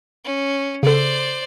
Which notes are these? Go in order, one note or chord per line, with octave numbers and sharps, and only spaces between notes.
C#4
C#3 A4 C5 D5